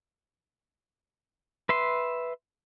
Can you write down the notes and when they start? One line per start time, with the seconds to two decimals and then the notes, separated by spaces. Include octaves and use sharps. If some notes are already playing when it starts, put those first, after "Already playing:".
1.69 B4 E5 C6